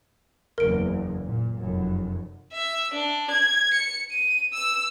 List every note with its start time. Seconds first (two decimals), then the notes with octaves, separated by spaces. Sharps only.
0.58 F#1 E2 A#4 D7
1.26 A#2
1.60 F1 F#2
2.53 E5
2.94 D4
3.30 G#6
3.74 C#7
4.11 D#7
4.53 E6